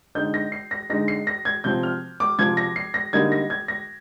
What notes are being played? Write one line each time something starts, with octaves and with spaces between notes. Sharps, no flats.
D3 G#3 D#4 G6
A#6
C7
A#6
D3 G#3 D#4 A#6
C7
A#6
G#6
C3 F3 C4 G6
F6
D6
C3 F3 C4 G#6
A#6
C7
A#6
D3 G3 A#3 D#4 G#6
A#6
G#6
A#6